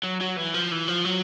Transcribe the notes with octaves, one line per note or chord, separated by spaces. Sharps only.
F#3
F#3
E3
F3
E3
F3
F#3